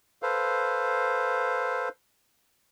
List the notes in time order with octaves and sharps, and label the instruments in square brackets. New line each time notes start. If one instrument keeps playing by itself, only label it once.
[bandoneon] A4 B4 C5 F5